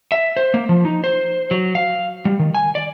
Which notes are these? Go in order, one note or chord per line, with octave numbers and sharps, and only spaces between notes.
E5
C5
A#3
F3
D#4
C5
F#3
F5
G3
D#3
G#5
D5